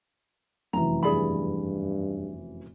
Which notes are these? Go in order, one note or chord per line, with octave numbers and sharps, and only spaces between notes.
F1 F#2 E3 A#5
G2 G#4 D5 B5